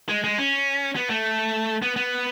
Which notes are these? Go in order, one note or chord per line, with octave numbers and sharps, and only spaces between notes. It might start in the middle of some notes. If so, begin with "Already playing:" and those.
G#3
G#3
C#4
B3
A3
B3
B3